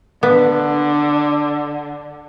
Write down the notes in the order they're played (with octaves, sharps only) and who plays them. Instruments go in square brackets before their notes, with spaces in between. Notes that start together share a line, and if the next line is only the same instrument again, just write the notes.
[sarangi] D3 [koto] B3